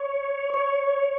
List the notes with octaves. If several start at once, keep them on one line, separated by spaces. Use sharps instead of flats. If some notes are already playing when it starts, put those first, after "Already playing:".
Already playing: C#5
C#5